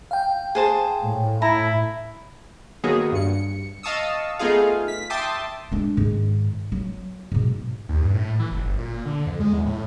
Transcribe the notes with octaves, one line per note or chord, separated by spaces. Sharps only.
F5 G5
G#4 C5 A5
A2
E4 A5 A#5
D#3 F#3 A#3 B3 G#4
G2 C#7
D#5 F5 A5 C#6 D#6 E6
A3 B3 D#4 F4 G#4 F5
B6
E5 G5 A5 C6 D6 D#6
G#3 D4
G#2 D#3
F#3
G#2 B2
D#2
G2
A2
E3
F#1
G1
A#2
D3
F2
G#3
E2
A2